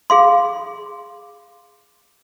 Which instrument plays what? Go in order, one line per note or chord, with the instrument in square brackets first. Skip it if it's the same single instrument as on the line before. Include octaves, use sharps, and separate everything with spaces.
[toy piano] G#4 F5 C6